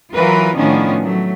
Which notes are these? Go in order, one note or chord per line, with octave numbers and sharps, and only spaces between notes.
E3 F#3 F4 A#4 B4
A2 D#3 F3 B3 C#4 D4
F#3 A3